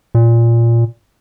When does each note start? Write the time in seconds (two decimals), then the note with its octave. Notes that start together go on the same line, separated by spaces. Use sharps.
0.15 A#2